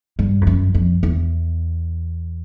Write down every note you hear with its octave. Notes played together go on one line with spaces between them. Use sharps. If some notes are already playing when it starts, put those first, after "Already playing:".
G2
F2
F#2
F2
E2